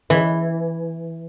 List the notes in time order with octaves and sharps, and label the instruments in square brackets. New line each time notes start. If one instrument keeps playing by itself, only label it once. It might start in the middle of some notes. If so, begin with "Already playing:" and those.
[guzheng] E3